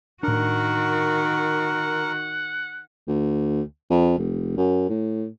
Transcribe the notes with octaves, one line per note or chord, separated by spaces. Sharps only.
A2 D#3 D4 F#4 A#4 F#5
D2
F2
F1
F#2
A2